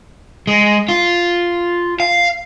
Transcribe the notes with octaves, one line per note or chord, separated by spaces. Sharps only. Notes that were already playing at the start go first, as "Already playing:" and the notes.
G#3
F4
F5